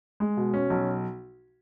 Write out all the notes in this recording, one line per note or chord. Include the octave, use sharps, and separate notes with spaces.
G#3
B2
C#4
B1